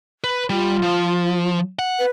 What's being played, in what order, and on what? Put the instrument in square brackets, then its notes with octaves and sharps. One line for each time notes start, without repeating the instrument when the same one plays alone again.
[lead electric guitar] B4
[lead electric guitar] G3 [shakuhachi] F4
[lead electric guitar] F3
F#5
[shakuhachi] B4